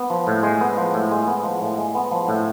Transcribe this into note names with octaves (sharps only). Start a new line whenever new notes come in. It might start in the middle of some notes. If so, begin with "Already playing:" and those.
Already playing: B3
F3
A2
G#3
B3
F3
A2
G#3
B3
F3
A2
G#3
B3
F3
A2